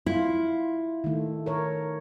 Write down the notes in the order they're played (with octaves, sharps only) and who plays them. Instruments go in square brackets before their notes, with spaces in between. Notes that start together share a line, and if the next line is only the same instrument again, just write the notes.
[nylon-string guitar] E4 [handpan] F4
[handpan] D#3 A3
A#4 C#5